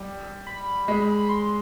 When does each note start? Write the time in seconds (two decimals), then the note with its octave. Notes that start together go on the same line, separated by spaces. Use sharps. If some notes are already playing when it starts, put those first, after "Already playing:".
Already playing: G3
0.47 B5
0.88 G#3
1.18 B5
1.29 C6